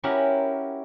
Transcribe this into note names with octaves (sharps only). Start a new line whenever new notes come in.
C#4 E4 F#4 G4 A#4